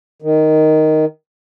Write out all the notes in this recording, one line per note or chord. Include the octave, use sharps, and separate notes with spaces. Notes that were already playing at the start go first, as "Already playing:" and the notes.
D#3